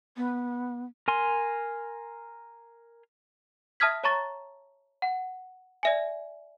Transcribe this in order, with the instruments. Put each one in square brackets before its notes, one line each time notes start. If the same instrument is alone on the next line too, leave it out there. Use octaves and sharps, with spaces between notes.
[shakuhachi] B3
[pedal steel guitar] A#4 G#5 C6
[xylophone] E5 A5 D#6 F6 G#6 B6
C#5 A5 A#5 C#6 A6
F#5
D5 E5 G#5